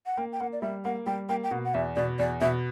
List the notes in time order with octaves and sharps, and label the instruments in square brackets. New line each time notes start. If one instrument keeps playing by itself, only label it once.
[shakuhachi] F#5
[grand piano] A#3 [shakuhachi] G5
[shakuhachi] G5
[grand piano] A#3 [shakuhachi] F#5
[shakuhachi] D5
[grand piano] G3 [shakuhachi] E5
[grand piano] A#3 [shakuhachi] F#5
[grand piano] G3 [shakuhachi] G5
[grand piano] A#3 [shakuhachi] G5
[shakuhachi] G5
[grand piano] B2 [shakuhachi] F#5
[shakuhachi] F#5
[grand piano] E2 [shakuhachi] E5
[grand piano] B2 [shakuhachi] D5
[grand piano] E2 [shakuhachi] D5
[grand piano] B2 [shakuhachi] E5